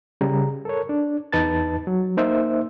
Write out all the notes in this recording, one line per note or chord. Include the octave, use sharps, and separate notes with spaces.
C#3 G3 A#5
A4 A#4 C#5
D4
E2 D#4 B4 A5 A6
F#3
A#3 D#4 C5 E5